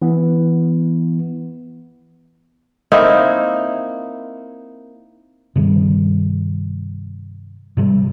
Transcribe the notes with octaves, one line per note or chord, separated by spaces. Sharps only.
E3 B3
A#3 C4 D#4 E4
G2 C3 D#3 G3
G#2 C3 G3